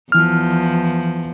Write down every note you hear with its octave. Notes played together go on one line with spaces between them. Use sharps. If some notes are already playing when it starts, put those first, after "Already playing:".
E2 E3 F3 F6